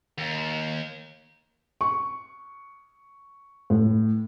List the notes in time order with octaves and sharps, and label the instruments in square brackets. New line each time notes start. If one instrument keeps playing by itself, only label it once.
[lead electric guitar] D#2
[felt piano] C#6
A2